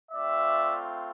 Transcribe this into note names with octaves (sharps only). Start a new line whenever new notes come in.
A3 C4 F4 D5 E5